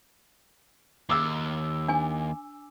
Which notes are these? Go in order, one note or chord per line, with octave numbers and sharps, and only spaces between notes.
D#2 D6 E6
D4 G#5